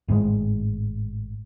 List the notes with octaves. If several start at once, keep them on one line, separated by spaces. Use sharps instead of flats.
G#1 A2 D3 G#3